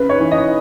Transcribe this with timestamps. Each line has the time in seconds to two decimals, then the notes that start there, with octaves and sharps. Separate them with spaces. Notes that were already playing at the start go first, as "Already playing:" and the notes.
Already playing: C#3 B4
0.09 C#5
0.20 E3
0.31 D#5